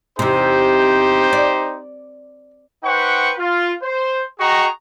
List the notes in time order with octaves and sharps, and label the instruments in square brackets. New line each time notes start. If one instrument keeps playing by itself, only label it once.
[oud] E2 C3 [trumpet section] D#4 G4 C5
[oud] D5
[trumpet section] D#4 B4 C5 F#5 G5 C#6
F4
C5
F#4 G#4 D#5 G5 A#5 C#6